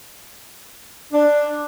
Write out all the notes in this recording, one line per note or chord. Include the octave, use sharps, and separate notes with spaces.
D4